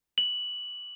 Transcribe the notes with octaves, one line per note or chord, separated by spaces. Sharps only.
F#7